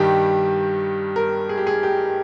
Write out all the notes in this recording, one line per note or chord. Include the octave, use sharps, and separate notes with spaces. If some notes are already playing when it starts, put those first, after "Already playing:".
Already playing: G2 D#3 G3 G4
A#4
G#4
G4
G#4
G4